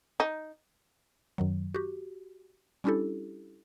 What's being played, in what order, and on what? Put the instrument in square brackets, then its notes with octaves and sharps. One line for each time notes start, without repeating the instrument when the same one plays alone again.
[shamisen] D#4
[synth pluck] F#2 D#3 F#3
F#4 G4
G3 C#4 D4 E4 G4 A4